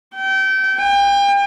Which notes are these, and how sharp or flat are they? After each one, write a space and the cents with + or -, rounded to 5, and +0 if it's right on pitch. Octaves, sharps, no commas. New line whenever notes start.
G5 -30
G5 +40